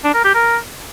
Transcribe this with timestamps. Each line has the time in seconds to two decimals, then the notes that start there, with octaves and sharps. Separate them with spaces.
0.04 D4
0.14 A#4
0.24 G4
0.35 A#4